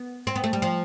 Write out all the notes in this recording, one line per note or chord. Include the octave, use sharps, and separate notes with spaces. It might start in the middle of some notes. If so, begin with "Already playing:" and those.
Already playing: B3
C4
B3
A3
G3
F3